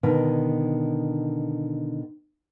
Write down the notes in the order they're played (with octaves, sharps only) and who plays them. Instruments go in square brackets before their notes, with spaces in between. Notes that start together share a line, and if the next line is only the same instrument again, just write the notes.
[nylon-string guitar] B2 D3 D#3